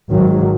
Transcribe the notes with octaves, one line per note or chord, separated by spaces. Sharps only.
G#1 G#2 D#3 F#3